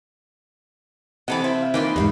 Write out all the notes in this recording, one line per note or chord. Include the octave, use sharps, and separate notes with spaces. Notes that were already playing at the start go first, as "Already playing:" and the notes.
C3 E3 A4 D#5 F#5 A5
E4 C5
F5
E3 A#3 D#4 F4 B4 G5
E2 G#2 G3 D#5 F5